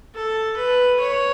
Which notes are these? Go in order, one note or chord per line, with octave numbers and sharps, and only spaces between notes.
A4
B4
C#5